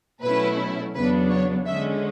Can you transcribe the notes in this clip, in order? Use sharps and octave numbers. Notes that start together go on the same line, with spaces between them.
B2 F#3 A3 C#4 E4 B4
E2 C#3 F#3 B3 D4 B4
C#5
D3 G#3 C#4 E5